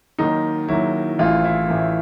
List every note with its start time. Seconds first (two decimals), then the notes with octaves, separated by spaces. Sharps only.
0.19 D#2 D#3 F#3 D#4
0.68 D#2 D#3 F#3 E4
1.19 A1 A2 E3 F4
1.44 E4
1.69 A1 A2 E3